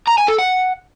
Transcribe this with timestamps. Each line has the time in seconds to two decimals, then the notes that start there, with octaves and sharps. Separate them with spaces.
0.08 A#5
0.18 G#5
0.28 A4
0.38 F#5